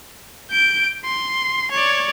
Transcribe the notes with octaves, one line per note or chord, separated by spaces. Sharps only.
G6 D7
C6
C#5 D5